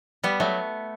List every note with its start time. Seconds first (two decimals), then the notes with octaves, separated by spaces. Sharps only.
0.24 G3 B3
0.40 F#3 A3